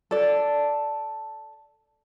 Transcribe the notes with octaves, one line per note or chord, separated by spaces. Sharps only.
A4 D5